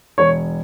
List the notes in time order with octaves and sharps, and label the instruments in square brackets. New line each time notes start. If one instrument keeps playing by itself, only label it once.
[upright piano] E1 C#5